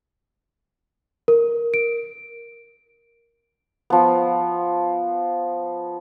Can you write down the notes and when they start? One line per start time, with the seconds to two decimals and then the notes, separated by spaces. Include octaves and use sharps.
1.28 A#4
1.74 D7
3.90 F3 B3